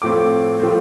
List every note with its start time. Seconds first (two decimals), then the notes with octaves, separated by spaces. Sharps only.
0.02 A2 F3 A3 C4 D6
0.60 A2 F3 A3 C4